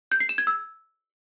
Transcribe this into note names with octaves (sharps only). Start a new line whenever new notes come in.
G6
C7
E7
G#6
E6